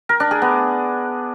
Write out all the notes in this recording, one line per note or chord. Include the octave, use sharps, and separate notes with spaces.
A#4
D4
G#4
B3